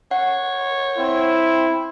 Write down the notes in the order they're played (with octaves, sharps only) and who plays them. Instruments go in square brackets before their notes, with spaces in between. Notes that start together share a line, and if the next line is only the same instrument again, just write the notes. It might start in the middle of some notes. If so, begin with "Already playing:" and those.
[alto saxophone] C#5 [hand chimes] F#5
[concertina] C4 [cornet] E4